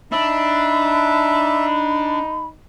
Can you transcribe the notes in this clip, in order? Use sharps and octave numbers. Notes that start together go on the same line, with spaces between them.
D4 D#4 E5 B5